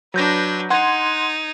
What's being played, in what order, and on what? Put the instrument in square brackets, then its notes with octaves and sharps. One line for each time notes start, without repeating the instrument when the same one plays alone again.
[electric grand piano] F#3 G6 A#6 [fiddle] D4 B4
[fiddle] D#4 [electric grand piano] F#5 C6 G#6